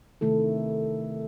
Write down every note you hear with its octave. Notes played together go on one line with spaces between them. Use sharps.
C3 D#3 A3 E4 A4